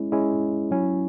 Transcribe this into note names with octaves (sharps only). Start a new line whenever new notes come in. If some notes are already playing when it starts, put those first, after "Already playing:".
Already playing: G#3 C#4 E4
G#3 C#4 E4
F#3 C#4 E4